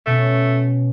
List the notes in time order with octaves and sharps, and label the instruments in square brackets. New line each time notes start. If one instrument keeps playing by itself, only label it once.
[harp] B2 C#4 [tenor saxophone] A3